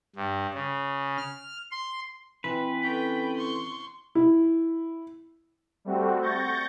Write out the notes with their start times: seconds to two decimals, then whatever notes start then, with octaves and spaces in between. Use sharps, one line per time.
0.16 G2
0.54 C#3
1.17 F6
1.71 C6
2.44 E3 C4 B4 G5
2.83 C4 C#4 A4 G5
3.37 C6 C#6
4.15 E4
5.85 G3 A3 C4 F#4
6.21 C#6 G6 A6 A#6